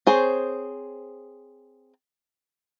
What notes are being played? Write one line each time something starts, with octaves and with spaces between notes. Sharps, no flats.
C4 G#4 C5 C#5